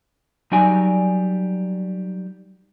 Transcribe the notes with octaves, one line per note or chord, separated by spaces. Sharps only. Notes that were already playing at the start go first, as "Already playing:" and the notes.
F#3 G3 D#4 F#4 D5 G#5